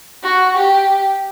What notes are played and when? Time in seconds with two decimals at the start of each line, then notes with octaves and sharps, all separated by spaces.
0.24 F#4
0.57 G4